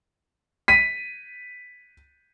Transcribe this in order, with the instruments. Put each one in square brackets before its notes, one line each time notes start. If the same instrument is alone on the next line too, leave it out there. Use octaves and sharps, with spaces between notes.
[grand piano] B6 D#7